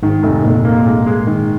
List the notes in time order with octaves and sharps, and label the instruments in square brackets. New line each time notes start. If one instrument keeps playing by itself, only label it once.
[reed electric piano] G#2 [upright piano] D#3
[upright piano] F1
[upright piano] F1 [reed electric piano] A#2
[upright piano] A#3
G#3
G#3
D#3